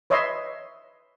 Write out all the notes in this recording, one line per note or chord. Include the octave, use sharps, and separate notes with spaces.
B4 C#5 D#5 E5 C6